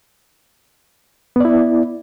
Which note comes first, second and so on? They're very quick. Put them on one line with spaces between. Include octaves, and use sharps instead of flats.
B3 D5 E4